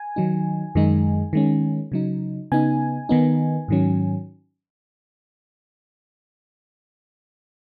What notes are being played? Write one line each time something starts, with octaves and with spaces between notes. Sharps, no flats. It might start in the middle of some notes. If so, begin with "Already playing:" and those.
Already playing: G#5
D#3 F#3 D#4
F#2 D#3 G#3 D#4
D#3 G#3 C#4
C#3 F#3 D#4
C#3 B3 D#4 G#5
D#3 B3 D#4
G#2 D#3 F#3 C#4